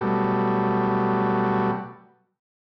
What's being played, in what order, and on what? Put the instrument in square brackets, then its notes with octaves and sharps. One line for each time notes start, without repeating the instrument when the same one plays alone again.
[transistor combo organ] B2 F#3 G3 A3